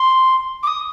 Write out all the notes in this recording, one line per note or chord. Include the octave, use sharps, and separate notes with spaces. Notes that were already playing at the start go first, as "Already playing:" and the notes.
Already playing: C6
D6
D#6